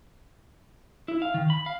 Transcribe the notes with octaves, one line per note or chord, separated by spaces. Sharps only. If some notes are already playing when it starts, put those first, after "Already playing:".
E4
F5
D#3
B5
F5